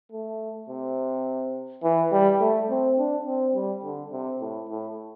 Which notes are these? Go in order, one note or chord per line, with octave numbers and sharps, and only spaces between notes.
A3
C3
E3
G3
A3
C4
D4
C4
G3
D3
C3
A2
A2